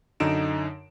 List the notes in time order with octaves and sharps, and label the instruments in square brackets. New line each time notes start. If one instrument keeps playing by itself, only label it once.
[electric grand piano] F#2 D3 D#4 D7 E7